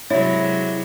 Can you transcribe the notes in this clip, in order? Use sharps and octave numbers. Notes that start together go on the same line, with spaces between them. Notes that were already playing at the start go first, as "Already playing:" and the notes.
C3 F#3 G#3 E4 C#5